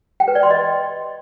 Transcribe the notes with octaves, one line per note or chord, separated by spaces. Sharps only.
G5
B4
D5
C6
D#5